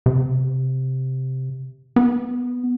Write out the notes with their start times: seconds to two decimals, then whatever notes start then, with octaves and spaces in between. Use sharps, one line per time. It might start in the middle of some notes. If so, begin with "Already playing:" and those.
0.06 C3
1.96 B3